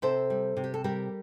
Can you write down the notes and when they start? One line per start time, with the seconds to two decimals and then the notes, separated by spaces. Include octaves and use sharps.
0.02 C3 A4 C5
0.30 G3
0.57 C3
0.64 G4
0.74 A4
0.84 G3 G4 A#4